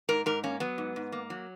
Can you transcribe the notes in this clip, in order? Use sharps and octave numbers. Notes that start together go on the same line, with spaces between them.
G#2 A#4
G#2 A#4
A#3 C#4
F#3 B3
G#2
G#2
A#3
F#3